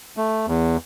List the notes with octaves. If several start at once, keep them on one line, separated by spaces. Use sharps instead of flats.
A3
E2